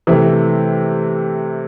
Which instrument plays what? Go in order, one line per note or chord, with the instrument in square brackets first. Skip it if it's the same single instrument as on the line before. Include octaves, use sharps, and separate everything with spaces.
[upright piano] C3 E3 A3